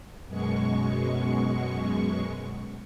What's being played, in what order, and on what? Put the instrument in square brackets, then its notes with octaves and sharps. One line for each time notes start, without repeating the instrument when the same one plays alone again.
[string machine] F#2 B2 G#3 C#6